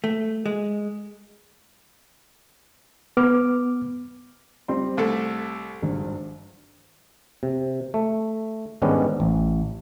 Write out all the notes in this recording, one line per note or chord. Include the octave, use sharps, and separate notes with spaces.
A3
G#3
B3 B4 D6 F6
G3 C4 C6
C2 A3 A4
G#1 G2
C3
A3
G#2 D#3 G3 B3 C#4 D4
A1